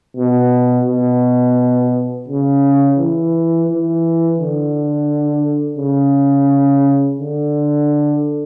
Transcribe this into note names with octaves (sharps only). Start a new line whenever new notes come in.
B2
B2
C#3
E3
E3
D3
C#3
D3